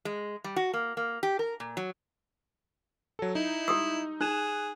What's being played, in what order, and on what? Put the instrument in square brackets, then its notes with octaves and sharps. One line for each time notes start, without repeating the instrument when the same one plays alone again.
[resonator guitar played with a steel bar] G#3
G3
F#4
A#3
A#3
G4
A#4
A#2
F#3
[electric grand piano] F#3 A4
[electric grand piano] D#4 [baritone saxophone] E4
[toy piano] G4 D#6 E6
[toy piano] D#4 [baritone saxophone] G#4 [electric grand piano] F#6 E7